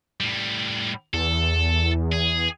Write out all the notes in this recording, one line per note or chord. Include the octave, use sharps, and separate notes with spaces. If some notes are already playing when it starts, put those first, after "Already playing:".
A2 G3
E2 A4
G#4